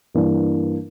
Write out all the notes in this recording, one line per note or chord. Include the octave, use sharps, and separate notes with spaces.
G2 E3 A#3 D4